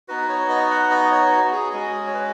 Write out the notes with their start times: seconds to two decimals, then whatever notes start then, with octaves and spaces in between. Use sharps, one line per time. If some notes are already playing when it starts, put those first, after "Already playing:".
0.08 B3 D#4 F#4 B4
0.29 C#5
0.49 D#5
0.71 F#5
0.91 D#5
1.11 C#5
1.32 F#4
1.52 G#4
1.73 G#3 C#4 F#4 G#4
2.07 C#5
2.14 B4